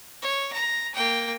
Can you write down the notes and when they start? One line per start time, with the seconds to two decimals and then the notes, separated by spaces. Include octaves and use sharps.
0.22 C#5
0.53 A#5
0.95 A#3 G5